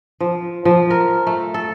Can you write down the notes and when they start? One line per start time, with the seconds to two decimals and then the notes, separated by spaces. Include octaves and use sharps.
0.20 F3
0.65 F3
0.90 A#4
1.27 A3
1.54 A4